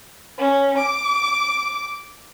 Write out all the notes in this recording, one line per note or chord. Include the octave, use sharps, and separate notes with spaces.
C#4
D6